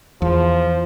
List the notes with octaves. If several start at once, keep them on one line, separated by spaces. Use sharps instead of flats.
E2 F3